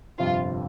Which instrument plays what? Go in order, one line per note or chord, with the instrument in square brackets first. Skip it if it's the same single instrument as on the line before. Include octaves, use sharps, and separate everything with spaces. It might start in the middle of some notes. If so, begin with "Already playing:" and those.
[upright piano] G1 F2 C3 [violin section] F4